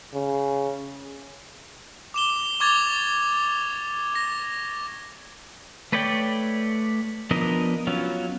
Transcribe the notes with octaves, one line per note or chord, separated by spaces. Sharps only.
C#3
D6 E7 G7
C#6 D6 G#6 A6 F7 G7
A#6
A3 B4 C#5 D5 G5
F3 B3 D4 A#4 D#5
F#3 B3 C#4 F4